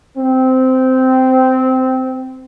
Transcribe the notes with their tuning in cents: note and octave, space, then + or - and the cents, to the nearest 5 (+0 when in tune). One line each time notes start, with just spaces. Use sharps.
C4 -15